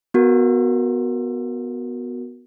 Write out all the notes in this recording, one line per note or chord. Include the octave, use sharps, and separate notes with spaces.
B3 F#4 A#4